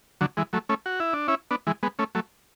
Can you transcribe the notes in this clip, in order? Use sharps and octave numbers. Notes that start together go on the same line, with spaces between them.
D3 F#3
E3 G#3
F#3 A3
A3 C#4
F#4
E4
D4
C#4 E4
B3 D4
E3 G#3
G#3 B3
A3 C#4
F#3 A3